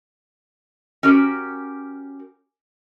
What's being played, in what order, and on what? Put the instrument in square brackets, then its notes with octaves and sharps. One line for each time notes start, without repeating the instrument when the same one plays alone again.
[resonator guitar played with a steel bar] C#4 F#4 G4 A#4